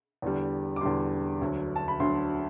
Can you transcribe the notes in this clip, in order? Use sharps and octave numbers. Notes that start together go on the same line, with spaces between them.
E2 D3 G3
D6
E2 D3 G3 C6
D2 D3 F#3
A5
B5
D2 D3 F#3 C6